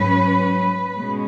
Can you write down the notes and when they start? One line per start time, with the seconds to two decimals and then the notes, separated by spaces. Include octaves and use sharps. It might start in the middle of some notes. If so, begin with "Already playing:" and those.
Already playing: G#2 F#3 C#4 B4
0.94 B2 G#3 C#4